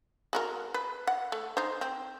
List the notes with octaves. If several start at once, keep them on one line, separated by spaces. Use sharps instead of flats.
G#3 F#4 A#4
B4
F#5
A3
D#4 C5
C4